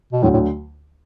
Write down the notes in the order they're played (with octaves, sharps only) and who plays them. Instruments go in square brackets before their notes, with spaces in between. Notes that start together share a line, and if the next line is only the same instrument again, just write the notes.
[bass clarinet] B2
[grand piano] D2 D3 F#3 [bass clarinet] A2
[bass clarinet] A2